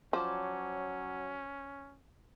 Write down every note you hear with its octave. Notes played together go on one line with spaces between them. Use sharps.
F3 F#3 C#4 C5 D5 A5